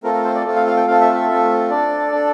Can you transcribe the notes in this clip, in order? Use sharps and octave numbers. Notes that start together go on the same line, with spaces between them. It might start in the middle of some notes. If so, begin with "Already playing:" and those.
A3 C4 F4 A4 A#4
A#4
C5
D5
A3 C4 F4 A4
F5
F5
G5
A3 C4 F4 A4 F5
E5
E5
A3 C4 F4 A4
D4 A4 D5
D4 A4